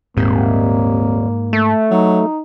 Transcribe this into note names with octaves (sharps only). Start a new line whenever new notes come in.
D#1 G#2 C3 A#3
A3
F#3 D#4